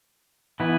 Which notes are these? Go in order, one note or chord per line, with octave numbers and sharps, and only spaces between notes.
E3 B3 E4 B4